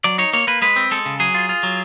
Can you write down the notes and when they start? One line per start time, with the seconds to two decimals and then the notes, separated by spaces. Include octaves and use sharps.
0.04 F#3 D5
0.18 D#4 C#5
0.33 A#3 C#5
0.47 A#3 B4
0.62 G#3 B4
0.76 C4
0.91 G#3 A4
1.06 C#3
1.20 F#3 G#4
1.35 F4
1.49 F4
1.63 F#3